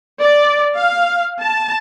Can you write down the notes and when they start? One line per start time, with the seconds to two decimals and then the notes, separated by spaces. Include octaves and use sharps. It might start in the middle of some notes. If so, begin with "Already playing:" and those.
0.17 D5
0.74 F5
1.40 A5